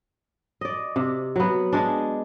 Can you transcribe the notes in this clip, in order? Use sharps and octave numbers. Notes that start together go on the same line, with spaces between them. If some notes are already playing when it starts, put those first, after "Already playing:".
D5 D#5
C3
F#3 B3
G#3 D4